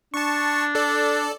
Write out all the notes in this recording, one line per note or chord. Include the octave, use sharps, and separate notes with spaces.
D4 A5 C#6
A4 D5